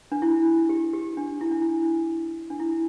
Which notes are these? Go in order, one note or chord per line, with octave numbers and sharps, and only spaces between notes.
D4
E4
G4
G4
D4
E4
D4
E4
D4
E4